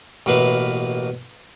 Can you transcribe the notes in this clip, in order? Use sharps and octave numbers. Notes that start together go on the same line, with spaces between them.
A1 B2 A#3 B4 E5 F5